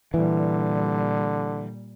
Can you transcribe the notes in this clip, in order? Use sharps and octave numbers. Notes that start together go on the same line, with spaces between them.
A#2 D3 E3 G3